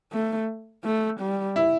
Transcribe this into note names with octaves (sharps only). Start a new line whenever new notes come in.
A3
A3
G3
E4